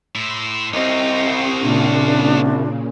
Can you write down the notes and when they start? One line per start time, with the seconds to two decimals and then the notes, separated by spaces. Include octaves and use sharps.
0.15 A2 E4 C6
0.74 C2 C4 C#4 F4 D#5 G5
1.61 A#2 C#3 D4